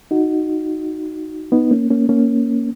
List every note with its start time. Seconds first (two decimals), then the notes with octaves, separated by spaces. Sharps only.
0.11 D#4 F#4
1.52 B3 D#4
1.71 A#3 C#4
1.90 A#3 C#4
2.09 A#3 C#4